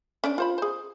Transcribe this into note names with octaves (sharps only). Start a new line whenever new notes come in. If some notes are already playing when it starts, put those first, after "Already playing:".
C#4 D4 D5
F4 C5 B5
G#4 C5